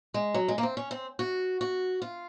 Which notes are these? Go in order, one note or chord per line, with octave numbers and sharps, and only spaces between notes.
G#3
F#3
G#3
A#3
C4
C#4
C4
F#4
F#4
F4